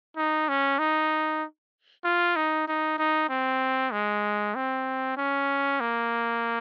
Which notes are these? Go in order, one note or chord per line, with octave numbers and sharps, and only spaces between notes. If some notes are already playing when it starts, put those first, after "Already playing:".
D#4
C#4
D#4
F4
D#4
D#4
D#4
C4
G#3
C4
C#4
A#3